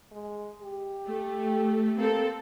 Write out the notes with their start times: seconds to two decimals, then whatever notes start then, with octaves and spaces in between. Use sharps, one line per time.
0.12 G#3
0.63 G4
1.06 A3
1.99 A#3 C4 A4